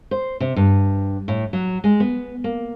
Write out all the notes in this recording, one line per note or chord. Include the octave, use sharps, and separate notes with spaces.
C5
C3
G2
A2
F#3
G#3
B3
A#3